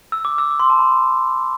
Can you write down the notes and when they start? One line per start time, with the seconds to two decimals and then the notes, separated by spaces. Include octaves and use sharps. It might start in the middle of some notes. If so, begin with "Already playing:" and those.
0.12 E6
0.25 D6
0.38 E6
0.51 D6
0.60 C6
0.70 A5
0.79 B5